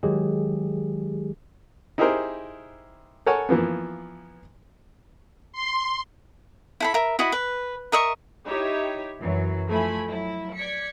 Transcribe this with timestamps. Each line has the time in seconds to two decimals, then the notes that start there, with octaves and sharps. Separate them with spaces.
0.03 D#3 F#3 G#3 G4 G#4
1.98 D#4 E4 G4 G#4 A#4 C5
3.26 A4 A#4 C#5 F#5 G#5
3.49 E3 F3 A#3 B3
5.53 C6
6.80 E4 A4 B5
6.94 A#4 E5
7.19 E4 F#4 D#5 B5
7.32 B4
7.92 A#4 D#5 E5 C#6
8.46 D#4 E4 G4 C#5 E5
9.18 F#2 E3 F#3
9.68 F3 A3 E4 G#5 B5
10.07 F#3 E4
10.55 D5 G#6 B6 C#7